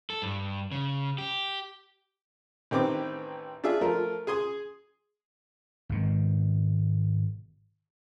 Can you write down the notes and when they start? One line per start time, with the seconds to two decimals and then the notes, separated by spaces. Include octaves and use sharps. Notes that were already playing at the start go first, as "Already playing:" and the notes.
0.10 A4
0.22 G2
0.72 C#3
1.18 G4
2.71 A1 D#3 C4 G4 B4 D6
3.64 D4 F4 G#4 E5
3.81 F3 A3 F4 A#4
4.27 G#4 G#5 C6 D#6
5.89 G#1 B2 D#3